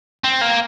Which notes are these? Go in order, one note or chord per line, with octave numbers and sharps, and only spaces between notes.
C4
A#3